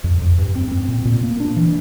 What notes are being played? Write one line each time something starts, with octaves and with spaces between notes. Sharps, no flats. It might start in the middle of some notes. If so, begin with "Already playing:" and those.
F2
F2
G2
C4
C4
A#2
A#2
A#3
D4
E3